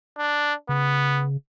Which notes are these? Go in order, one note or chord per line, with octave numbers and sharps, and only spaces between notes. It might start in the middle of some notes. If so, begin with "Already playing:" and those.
D4
C#3 B3